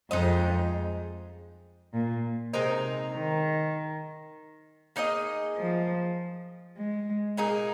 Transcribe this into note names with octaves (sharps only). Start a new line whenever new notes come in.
F2 G#3 D#4 C5 D#5
A#2
C3 G#3 C4 D#4 A#4
D#3
A#3 D#4 G#4 D#5
F3
G#3
A#2 A#3 D#4 G#4